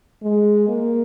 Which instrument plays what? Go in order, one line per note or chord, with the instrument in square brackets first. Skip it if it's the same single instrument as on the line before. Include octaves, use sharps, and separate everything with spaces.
[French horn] G#3
A#3